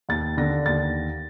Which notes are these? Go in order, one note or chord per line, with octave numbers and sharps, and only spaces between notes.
D#2 A6
D3 A#6
D#2 A6